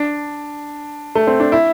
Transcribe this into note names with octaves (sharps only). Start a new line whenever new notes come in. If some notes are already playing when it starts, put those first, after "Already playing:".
Already playing: D4
A3
C4
D4
E4